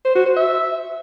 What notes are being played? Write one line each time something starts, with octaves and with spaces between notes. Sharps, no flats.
C5
F#4
C5
E5